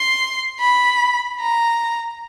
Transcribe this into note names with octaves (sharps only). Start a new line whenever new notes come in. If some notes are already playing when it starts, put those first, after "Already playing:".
Already playing: C6
B5
A#5